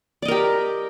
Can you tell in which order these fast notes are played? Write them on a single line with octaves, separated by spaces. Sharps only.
D5 D#5 A#4 G4